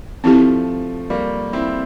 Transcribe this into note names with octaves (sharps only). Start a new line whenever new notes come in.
F3 A3 C4 E4 G4
G3 A#3
C4 E4